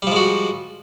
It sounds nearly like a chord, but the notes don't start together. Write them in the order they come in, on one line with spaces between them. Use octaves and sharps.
G3 F3 G#3 F#4